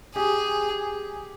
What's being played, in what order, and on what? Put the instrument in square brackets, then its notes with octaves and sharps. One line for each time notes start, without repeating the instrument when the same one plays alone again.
[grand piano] G4 [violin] G#4